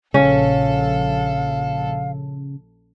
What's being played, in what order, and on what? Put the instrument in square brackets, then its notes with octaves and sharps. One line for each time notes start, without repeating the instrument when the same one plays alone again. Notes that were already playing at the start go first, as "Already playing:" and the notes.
[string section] A#1 A4 [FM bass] C#3 [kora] C#4 [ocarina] F5